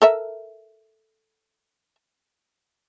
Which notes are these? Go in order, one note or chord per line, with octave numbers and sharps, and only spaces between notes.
A4 A#4 E5